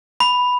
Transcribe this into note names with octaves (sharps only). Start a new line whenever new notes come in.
B5